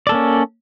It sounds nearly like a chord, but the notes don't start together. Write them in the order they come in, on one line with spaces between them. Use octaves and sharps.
D5 A4 A#3 C#4